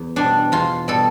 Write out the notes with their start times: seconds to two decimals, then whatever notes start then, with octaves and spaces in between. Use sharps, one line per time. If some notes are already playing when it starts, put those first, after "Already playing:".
Already playing: E2
0.16 B2 G3 D4
0.52 E2 F4
0.88 B2 G3 A4